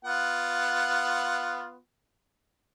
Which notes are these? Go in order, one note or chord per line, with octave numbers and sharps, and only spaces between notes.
B3 F4 F#5